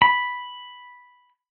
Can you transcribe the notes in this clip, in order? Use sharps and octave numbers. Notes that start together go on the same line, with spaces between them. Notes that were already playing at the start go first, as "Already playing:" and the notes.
B5